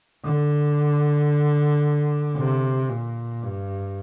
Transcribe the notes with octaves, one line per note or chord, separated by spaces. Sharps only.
D3
C3
A#2
G2